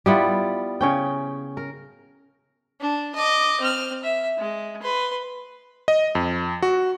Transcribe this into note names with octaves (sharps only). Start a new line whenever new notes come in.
G3 B3 E4 F4
C#3 C#4 G5
A#4
D4
D#5 D6
C4 F6
E5
G#3
B4 C6
D#5
F2
F#4